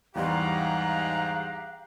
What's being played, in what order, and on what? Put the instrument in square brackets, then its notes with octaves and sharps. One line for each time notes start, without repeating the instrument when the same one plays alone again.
[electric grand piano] E2 G3 C6 [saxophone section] G#2 [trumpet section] G4 F#5 A#5 [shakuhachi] F5